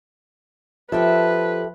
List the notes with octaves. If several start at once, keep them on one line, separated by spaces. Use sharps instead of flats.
F3 G4 A4 B4 E5